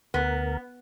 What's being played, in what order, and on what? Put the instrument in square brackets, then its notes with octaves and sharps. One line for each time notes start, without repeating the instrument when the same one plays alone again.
[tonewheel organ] D2 A#4 [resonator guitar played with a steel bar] B3